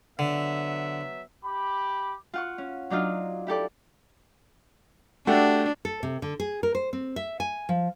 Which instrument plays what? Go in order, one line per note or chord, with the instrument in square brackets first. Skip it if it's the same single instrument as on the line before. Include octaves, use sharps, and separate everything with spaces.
[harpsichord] D3 [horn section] F#3 B3 E5
[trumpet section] G4 B5 D6
[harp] F4 F#5 C#6
C#4
F#3 D4 D#4 F4
E4 G4 A4 D5
[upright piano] A3 F#4 G4 [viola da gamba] D4
[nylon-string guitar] A4
C3
D3
G#4
A#4
C5
C4
E5
G#5
F3